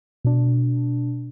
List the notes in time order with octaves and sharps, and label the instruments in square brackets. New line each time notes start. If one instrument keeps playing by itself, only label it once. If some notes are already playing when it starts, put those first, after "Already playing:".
[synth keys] B2 D4